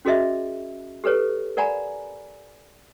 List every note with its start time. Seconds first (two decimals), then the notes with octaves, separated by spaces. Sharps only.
0.05 C#4 F#4 G#4 A#4 D#5 E5
1.04 G4 A4 B4 C#5
1.57 A#4 D5 F#5 G#5 A#5 B5